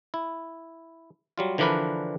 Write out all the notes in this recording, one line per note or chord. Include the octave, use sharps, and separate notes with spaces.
E4
F#3 G3 F4
D3 E3 F3 D4 A#4 B4